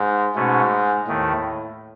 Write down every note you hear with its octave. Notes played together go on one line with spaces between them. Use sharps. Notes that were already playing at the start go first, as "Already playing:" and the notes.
Already playing: G#2
G#2 B2 A3 C#4
D#2 A2 D#3 A3